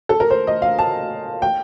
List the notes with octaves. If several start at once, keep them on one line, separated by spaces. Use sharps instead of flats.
A4
A#4
C5
D#5
F5
A5
G5